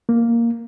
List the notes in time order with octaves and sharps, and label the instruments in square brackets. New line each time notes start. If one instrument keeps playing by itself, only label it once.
[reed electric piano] A#3